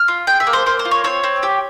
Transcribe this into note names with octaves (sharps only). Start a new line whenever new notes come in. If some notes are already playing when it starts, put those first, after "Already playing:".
Already playing: F6
F4
G#4 G5
E5
A#3
C5
A#3 C5
C5
F4
C#5
C4 C#5
C4
G4